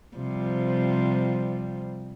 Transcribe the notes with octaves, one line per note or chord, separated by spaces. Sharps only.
C3 F3 G3